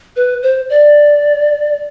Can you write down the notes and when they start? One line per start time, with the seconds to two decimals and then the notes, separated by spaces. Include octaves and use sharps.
0.16 B4
0.43 C5
0.70 D5